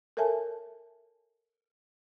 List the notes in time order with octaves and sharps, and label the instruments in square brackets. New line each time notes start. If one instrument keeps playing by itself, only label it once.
[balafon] A4 A#4 C#5 E5 G#5 A5